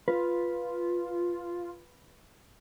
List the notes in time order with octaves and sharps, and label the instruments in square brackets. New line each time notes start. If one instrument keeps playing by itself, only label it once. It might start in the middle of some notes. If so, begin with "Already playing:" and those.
[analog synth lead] F4 [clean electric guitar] B4